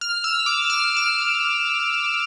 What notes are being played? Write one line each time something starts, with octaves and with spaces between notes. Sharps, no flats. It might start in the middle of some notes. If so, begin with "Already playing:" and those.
F6
E6
D6
F6
F6